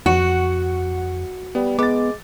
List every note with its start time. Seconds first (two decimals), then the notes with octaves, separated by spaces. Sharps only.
0.06 F2 F#4 F#5 C#6
1.55 G3 B3
1.79 G#3 B3 D6 A6